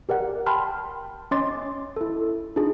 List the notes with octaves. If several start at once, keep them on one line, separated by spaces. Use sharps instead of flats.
G4 A#4 D5 F#5
G5 A5 B5 C6 F6
C#4 C#5 D#5 C6 D6 A6
E4 A4
D4 D#4 F4 G#4